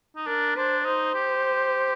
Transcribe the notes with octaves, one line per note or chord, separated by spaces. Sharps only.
D#4
D4 A#4
D4 C5
D#4 C5
G4